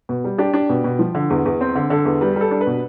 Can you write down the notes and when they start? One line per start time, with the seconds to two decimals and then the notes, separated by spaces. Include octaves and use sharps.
0.09 B2
0.24 G3
0.38 D4 G4
0.54 D4
0.70 B2
0.84 B2
0.99 F3
1.15 D3
1.30 E2
1.45 E2
1.61 C4
1.75 D3
1.90 D3 A4
2.05 E2
2.21 G3 B4
2.36 G3 A4
2.51 D4
2.61 B4
2.67 B2